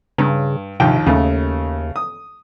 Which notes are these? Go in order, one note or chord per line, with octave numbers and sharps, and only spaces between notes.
G2 C#3
A#1 D#2 C3 G5
D#2 C#3 A3
D#6